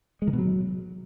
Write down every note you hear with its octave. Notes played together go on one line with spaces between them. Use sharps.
G#3
D#3
B2
F#3